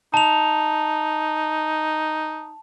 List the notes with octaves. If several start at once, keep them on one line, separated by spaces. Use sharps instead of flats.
D#4 A5 F7